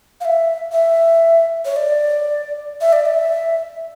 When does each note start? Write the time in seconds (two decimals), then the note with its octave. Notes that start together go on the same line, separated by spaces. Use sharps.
0.21 F5
0.25 E5
0.72 E5
1.65 C#5
1.76 D5
2.81 E5
2.93 D5
3.05 E5